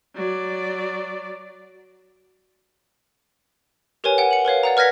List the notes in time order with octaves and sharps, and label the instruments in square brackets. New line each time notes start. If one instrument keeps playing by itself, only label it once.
[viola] F#3 D5
[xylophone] G4 A#4 B4 C#5 G#5
F#5 G5
C#7 F#7
A#4 B4 C#5 F5
D5 F#5 A#5
B4 F6 G#6 A#6 B6